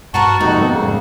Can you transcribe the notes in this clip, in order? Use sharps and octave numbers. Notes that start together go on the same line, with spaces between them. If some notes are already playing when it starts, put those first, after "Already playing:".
G2 F#4 A#4 B4 A5 C#6
D#1 F2 G#2 C3 A#3 D#4 F#4
G3 A3 B3 A4
G#2 C#3 G#3 A#3
F2 G#3